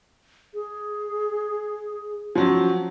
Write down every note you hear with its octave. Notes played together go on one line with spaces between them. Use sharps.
G#4
F3 F#3 C#4